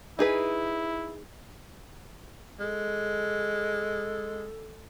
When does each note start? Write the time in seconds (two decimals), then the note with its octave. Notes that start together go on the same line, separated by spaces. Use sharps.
0.19 D#4 E4 G#4 B4
2.60 G#3 A4